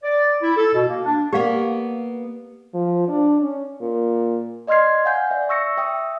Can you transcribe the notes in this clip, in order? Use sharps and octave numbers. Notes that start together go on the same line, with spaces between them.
D5
E4
A4
B2
A#3
D4
A#3 B3 G4 D5 F5
F3
D4
C#4
A#2
D5 D#5 C6 F6 G#6 C7
F5 F#5 G#5 G6
D5 E5
C#6 E6 A#6 C#7
E5 G5 D#6 E6